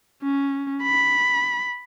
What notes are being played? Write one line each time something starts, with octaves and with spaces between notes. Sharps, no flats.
C#4
B5